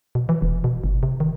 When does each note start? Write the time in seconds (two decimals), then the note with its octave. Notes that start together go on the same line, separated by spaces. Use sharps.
0.15 B2
0.29 E3
0.42 E1
0.64 B2
0.84 G1
1.03 C3
1.20 D#3